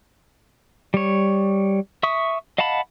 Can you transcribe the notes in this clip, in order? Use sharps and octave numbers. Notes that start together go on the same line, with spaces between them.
G3 C#5
E5 C#6 D#6
D#5 F5 F#5 A5 B5